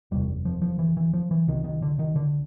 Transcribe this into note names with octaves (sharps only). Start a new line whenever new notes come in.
F#1 E2 C3 G3
F3
F3
E3
E3
F3
E3
C2 C3 D#3
D#3
D3
D#3
D3